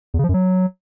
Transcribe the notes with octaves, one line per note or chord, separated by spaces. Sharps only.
E2
C#3
F3
F#2
F#3